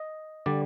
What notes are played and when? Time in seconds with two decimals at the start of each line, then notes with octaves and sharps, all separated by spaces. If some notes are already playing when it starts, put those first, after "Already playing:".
Already playing: D#5
0.46 D3 G3 D5